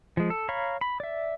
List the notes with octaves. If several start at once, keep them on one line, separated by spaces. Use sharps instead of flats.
F3 G#3
A4
C#5 F5 A#5 B5 C#6
B5
D5 E5